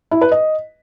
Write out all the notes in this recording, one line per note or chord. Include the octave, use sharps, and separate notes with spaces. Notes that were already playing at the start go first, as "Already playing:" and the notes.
E4
B4
D#5